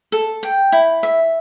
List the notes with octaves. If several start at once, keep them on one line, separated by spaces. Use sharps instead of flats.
A4
G5
E4
E5